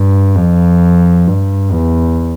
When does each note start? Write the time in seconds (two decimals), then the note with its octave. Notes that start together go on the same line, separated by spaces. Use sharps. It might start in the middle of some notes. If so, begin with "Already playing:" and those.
Already playing: G2
0.36 F2
1.27 G2
1.73 E2